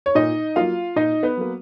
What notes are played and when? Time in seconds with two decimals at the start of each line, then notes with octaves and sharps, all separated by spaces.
0.06 C#5
0.15 A#2 D#4 D#5
0.56 F#3 A#3 F4 F5
0.96 A#2 D#4 D#5
1.23 B3 B4
1.37 F#3 A#3